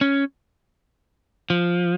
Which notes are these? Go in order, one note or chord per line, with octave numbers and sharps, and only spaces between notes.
C#4
F3